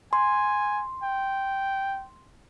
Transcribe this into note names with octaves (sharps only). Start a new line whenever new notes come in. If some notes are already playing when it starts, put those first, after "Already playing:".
G#5 C6
G5